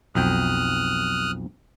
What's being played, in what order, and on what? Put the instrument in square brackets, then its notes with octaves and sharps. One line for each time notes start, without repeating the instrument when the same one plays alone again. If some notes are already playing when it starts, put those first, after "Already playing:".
[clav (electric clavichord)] B1 F2 G5 [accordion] D#6 F6 F#6